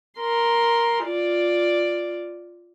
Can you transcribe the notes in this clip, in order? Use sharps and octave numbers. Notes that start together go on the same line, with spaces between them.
A#4 C6
F4 D5